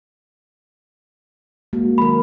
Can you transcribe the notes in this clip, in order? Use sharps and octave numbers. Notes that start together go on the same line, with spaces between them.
G#3 A#3 F#4
D#3 F#3 A#4 B5